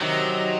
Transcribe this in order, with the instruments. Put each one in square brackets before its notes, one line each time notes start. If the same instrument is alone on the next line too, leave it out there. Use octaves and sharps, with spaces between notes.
[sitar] C3 D#3 [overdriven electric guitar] F#3